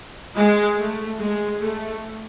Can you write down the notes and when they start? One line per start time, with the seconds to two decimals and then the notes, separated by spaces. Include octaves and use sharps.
0.35 G#3
0.77 A3
1.18 G#3
1.60 A3